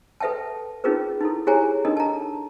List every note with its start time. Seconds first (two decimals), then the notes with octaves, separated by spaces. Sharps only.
0.20 A4 B4 E5 G5 A5
0.84 C#4 D#4 F4 G#4 A#4 B4
1.21 D#4 E4 A4
1.47 E4 G4 G#4 C#5 G#5 A#5
1.85 D4 D#4 A4 A#4 D#5
1.97 A5 A#5